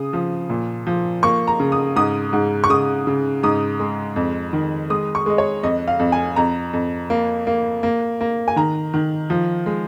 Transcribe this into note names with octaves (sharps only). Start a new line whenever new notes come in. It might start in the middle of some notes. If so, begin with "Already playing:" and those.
Already playing: C#3 D#6
F3
A#2
F3
A#3 C#6
A#5
C#3
D#6
G#2 D#6
G#2
C#6
C#3 D#6
C#3
G#2 D#6
G#3
F2
D#3
G#3 D#6
C#6
G#3 D#5
C#5
F2 D#5
F5
F2
G#5
F2 A#5
F2
A#3
A#3
A#3
A#3
G#5
D#3 A#5
D#3
F3
G#3